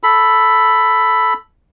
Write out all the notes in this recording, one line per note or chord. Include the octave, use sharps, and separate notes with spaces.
A4 B5